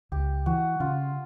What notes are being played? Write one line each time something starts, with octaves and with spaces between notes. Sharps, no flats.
C#2 G4
E3 F#4
C#3 F4